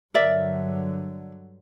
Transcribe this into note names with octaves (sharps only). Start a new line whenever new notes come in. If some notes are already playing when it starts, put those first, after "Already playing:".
G2 D3 F#3 A#4 D5 E5